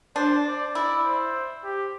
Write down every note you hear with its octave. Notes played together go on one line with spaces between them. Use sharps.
D4 C5
D5
E4 D5
C5
G4